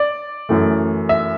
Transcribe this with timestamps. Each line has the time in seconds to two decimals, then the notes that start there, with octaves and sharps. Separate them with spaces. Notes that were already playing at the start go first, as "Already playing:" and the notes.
Already playing: D5
0.49 F#2 E3 A3
1.09 E5